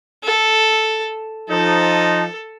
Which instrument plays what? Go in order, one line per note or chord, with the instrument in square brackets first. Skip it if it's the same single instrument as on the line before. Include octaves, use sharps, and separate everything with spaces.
[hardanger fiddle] A4
[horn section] F3 D#4 [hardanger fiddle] A4